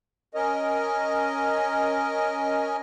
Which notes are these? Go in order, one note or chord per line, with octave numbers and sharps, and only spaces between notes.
C#4 A#4 D#5